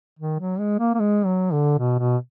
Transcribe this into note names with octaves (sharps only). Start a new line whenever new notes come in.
D#3
F#3
G#3
A#3
A#3
G#3
F#3
D3
B2
B2